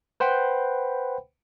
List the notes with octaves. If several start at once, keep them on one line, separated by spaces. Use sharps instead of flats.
B4 C5 F#5 G5 B5